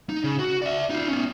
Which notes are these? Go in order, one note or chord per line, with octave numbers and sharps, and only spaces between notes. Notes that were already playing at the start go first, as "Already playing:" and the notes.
D#4
C#3
F#4
D5 E5
D#4 F4
B3 C#4